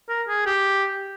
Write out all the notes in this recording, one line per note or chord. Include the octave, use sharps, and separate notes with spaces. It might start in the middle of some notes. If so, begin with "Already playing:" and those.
A#4
G#4
G4